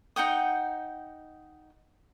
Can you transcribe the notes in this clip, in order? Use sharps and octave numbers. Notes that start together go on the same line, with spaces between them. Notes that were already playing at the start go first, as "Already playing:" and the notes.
D#4 F#5 G5 D#6